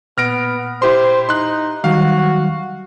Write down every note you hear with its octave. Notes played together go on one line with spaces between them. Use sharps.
A#2 B3 F6 A#6 D7
E4 G4 C5 C6
D#4 C6 F#6
D#3 F#3 G3 F#4 F5